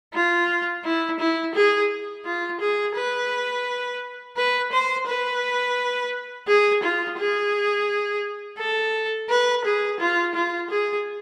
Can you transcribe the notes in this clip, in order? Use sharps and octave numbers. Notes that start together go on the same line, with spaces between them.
F4
E4
E4
G#4
F4
G#4
B4
B4
C5
B4
G#4
F4
G#4
A4
B4
G#4
F4
F4
G#4